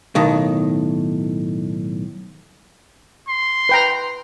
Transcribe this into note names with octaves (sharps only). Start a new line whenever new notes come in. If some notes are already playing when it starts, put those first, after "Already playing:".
B1 A2 D#3
C6
B4 G5 A#5